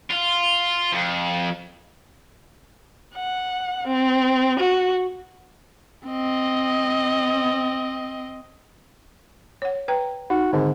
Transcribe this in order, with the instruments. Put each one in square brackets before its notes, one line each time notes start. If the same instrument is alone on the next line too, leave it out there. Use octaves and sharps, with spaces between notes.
[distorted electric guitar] F4
F2
[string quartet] F#5
C4
F#4
[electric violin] C4 D#5
[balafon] C#5 F#5
B4 G5 A#5
[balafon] D#4 [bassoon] F#4
[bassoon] G#2 [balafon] D3 D#3 C4